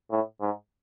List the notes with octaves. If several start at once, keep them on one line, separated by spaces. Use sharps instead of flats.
A2
G#2